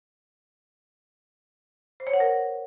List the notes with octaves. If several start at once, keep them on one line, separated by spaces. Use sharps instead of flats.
C5
C#5
F#5
A#4